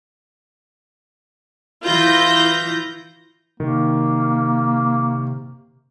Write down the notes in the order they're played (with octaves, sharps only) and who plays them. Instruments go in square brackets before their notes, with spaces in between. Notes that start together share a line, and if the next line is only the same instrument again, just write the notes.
[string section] E3 E4 F4 G6 A#6
[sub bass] C3 [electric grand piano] D#3 [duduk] A#3